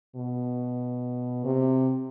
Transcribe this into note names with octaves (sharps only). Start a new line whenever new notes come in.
B2
C3